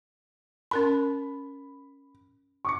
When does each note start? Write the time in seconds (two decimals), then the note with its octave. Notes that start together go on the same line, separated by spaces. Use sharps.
0.71 C#4 A#4 B5 C6
2.65 C#6 D6 C#7